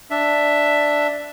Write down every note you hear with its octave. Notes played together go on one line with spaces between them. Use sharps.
D4 E5